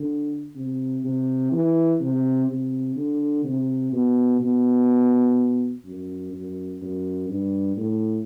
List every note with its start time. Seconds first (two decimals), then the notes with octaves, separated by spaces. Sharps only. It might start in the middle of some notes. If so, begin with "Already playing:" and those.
Already playing: D3
0.56 C3
1.04 C3
1.52 E3
2.00 C3
2.48 C3
2.96 D3
3.44 C3
3.93 B2
4.40 B2
5.85 F#2
6.33 F#2
6.81 F#2
7.29 G2
7.77 A2